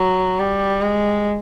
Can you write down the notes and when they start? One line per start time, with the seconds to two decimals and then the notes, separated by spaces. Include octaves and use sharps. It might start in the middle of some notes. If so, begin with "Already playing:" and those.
Already playing: F#3
0.39 G3
0.82 G#3